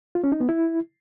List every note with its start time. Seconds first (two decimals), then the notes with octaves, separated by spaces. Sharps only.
0.15 F4
0.24 C#4
0.32 D#4
0.40 B3
0.49 E4